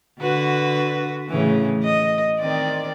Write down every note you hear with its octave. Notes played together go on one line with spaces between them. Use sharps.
D3 F#4 B4
A2 C#3 E3
D#5
D#3 C4 D5